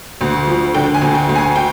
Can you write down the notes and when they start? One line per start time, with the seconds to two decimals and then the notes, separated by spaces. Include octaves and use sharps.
0.21 D2
0.47 F3
0.74 D3 G5
0.94 G#5
1.02 D2
1.15 G5
1.29 D2
1.35 G#5
1.56 G5